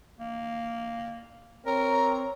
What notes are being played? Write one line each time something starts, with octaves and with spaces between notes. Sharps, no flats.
A#3
C4 A#4 C#5 A#5